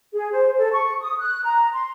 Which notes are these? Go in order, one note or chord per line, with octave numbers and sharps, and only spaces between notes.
G#4
C5
A4
C#6
D#6
F#6
A#5
C6